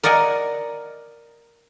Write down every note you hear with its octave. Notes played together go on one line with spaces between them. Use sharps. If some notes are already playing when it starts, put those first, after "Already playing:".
A#4 D5 D#5 F#5 G#5